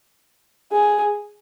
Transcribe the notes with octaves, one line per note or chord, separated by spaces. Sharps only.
G#4